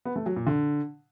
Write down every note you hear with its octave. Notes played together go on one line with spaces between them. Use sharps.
B3
A3
F#3
A#2
D3